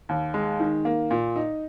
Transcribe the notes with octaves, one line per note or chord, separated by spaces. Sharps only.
D#2
G#3
D#3
A#3
A#2
D#4